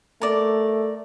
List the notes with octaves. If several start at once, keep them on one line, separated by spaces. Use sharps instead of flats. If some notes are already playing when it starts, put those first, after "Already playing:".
A3 A#4 D5